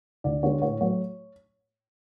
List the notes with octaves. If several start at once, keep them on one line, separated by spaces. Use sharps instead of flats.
D2 D5
D3 G#3 C#5
A2 C#5
F#3 A3 C#5